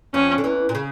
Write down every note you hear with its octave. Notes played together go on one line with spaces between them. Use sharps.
F2 F3 C#4
D3
E2 E3
A#2
C#3